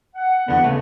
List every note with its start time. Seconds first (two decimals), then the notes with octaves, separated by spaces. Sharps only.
0.15 F#5
0.48 E2 D3 B3
0.64 C#3 A3